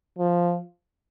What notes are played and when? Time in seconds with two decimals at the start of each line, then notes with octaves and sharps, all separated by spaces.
0.19 F3